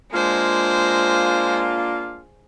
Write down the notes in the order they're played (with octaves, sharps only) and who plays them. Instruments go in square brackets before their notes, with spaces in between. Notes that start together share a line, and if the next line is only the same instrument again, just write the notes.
[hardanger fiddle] G#3 C5 [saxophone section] A#3 D4 F4